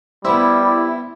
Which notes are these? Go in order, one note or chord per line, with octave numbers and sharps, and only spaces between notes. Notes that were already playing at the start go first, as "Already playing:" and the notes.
G3 B3 C4 E4